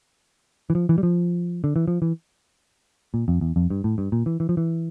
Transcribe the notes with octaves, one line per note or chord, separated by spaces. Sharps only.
E3
F3
E3
G3
F3
D3
E3
F3
E3
A#2
F2
E2
F2
G2
A2
G2
A#2
E3
E3
F3
E3